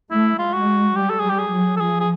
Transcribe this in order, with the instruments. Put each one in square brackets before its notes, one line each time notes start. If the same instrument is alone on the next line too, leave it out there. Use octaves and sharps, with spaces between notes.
[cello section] A3 [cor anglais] E4
[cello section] G#3 [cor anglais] F4
[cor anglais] F#4
[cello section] G3 [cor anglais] G4
[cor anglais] A4
[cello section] G3 [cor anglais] G#4
[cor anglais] G4
G#4
[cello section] F#3
[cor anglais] A4
[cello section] F3 [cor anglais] G#4
[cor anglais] G#4